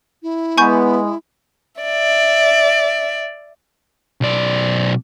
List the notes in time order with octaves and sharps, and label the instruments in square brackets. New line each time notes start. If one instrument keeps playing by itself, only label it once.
[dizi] E4
[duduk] G#3 [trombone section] B3 [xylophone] G#5 C#6 G6
[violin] D5 E5
[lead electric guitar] B1 D5